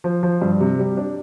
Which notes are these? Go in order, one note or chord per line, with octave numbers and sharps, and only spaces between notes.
F3
F3
G2
C3
G3
D4